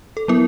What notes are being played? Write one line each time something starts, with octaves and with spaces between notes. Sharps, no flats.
A4
F#3 B3 E4 A#4